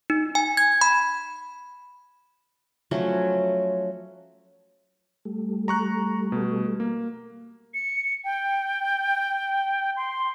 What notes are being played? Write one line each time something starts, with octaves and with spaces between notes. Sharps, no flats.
D#4
G#5
G#6
B5
F3 F#3 A3 C#4
G3 A3
A#5 C#6 F#6
B2
A#3
C#7
G5
C6